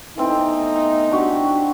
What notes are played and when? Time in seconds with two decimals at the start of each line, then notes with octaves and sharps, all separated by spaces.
0.18 E3 A3 B3 C4 D#4 E4
1.11 D4 F#4 G4